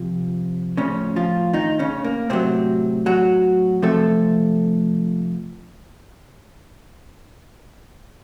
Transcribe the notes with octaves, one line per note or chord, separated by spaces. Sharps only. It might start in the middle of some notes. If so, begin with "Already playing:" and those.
Already playing: C3 F3
A2 C#3 F3 C#4
F3 F4
D#3 D#4
C#3 C#4
A#3
A2 C3 F#3 C4
F#3 F#4
C3 F3 A3 A4